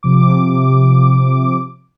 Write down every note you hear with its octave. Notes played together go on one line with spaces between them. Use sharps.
C3 F3 D6